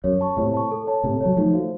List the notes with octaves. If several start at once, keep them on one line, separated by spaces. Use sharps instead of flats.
F#2 C#5
A5 C#6
A2 C3 C#5
A5 C#6
A4
C#5 A5
A2 C3 A4
F#3 C#5 A5
F3 A3 D#4
F#4 C5 F5